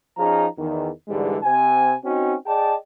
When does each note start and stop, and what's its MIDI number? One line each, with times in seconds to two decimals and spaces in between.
0.18 0.45 53
0.18 0.45 61
0.18 0.45 63
0.18 0.45 68
0.18 0.45 82
0.58 0.89 40
0.58 0.89 51
1.08 1.37 44
1.08 1.37 50
1.08 1.37 52
1.08 1.37 55
1.08 1.37 56
1.44 1.95 48
1.44 1.95 60
1.44 1.95 80
2.04 2.34 60
2.04 2.34 61
2.04 2.34 63
2.04 2.34 66
2.46 2.75 68
2.46 2.75 74
2.46 2.75 75
2.46 2.75 79
2.46 2.75 81